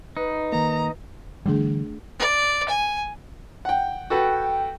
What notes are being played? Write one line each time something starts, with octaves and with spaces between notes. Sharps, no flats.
D#4 B4
D#3 A#3 A#5
D3 E3 G3 A3 D4 G#4
D5
G#5
F#5 G5
F#4 A4 B4 G5